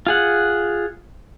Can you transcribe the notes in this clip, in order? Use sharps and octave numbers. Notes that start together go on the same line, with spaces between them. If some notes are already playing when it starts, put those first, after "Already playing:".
F4 G#4 F#5